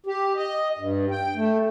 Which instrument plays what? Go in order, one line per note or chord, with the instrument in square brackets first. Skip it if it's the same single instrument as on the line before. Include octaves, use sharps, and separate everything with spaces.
[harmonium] G4
D#5
G2
G5
A3